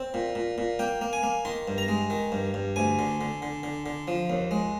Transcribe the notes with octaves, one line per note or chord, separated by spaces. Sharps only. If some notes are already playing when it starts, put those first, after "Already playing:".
Already playing: C4
A#2
A#2
A#2
A#3 G5
A#3
G#5
A#3
D#3 C6
G2
A#5
G#3
D#3
G2
G2
D2 G#5
D3
D3
D3
D3
D3
F3
D#2
G#3